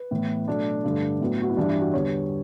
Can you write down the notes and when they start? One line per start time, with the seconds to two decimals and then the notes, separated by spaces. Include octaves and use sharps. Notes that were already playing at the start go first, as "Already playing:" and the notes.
Already playing: B4
0.11 A2 E3 B3
0.47 B2 F#3 A3 D4
0.84 G2 D3 A3
1.21 A2 F#3 B3
1.42 F#4
1.49 E4
1.57 G2 E3 G3 D4
1.69 E4
1.81 F#4
1.93 E2 D3 G3 B3 C#5